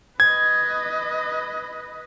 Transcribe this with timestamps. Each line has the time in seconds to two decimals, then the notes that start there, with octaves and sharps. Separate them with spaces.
0.20 B4 D#5 G#6